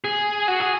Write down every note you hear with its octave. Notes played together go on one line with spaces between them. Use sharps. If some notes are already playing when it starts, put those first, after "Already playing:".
G#4
F#4
G#4